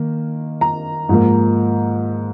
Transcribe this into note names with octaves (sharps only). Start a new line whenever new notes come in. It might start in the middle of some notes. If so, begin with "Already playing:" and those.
Already playing: D#3 A#3
A#5
G#2 F3 A#3